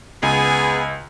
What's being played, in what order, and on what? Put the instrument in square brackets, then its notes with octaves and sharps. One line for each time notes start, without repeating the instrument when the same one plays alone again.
[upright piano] C#2 [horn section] B3 G#4 [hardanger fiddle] G#5